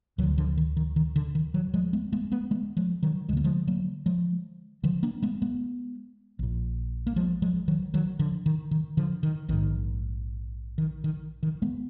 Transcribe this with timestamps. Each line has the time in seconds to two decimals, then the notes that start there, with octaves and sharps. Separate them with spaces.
0.18 D2 D#3 F#3
0.23 D3
0.38 D3 F3
0.57 D#3
0.77 D#3
0.96 D#3
1.16 D3
1.35 D#3
1.54 D#3 F#3
1.74 F3 G#3
1.93 G#3 B3
2.12 G#3 B3
2.31 G#3 B3
2.51 G#3 B3
2.77 F3 G#3
3.03 D#3 F#3
3.28 D2 G#3
3.33 D3 A#3
3.44 F3 G#3
3.67 F#3 A#3
4.06 F3 G#3
4.84 D3 F3
5.03 A#3 D4
5.22 G#3 B3
5.42 G#3 B3
6.39 A#1 A#2
7.07 A#3
7.16 F3 G#3
7.42 F3 G#3
7.68 D#3 F#3
7.94 D#3 F#3
8.19 D3 F3
8.46 D#3
8.71 D#3
8.97 D3 F3
9.23 D#3
9.48 A#1 G#2 D#3
10.78 D#3
11.04 D#3
11.43 D#3
11.62 G#3 B3